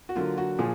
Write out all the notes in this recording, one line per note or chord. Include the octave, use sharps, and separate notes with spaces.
F#4
D3 F#3 A#3 F4
F#4
A#2 F3 G#4